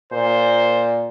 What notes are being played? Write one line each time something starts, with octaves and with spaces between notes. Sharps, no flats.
A#2 C5